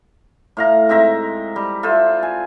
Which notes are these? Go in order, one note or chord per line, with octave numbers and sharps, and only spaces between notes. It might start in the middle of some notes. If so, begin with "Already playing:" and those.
A2 F5 A#5
G#2 C4 E5 A#5
G3
F4 A4 C5 E5
G#5